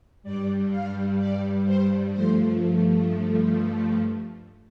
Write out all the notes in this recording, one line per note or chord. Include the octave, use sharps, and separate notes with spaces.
G2 G3 D5
F5
D5
C5
G2 F3 A3 C5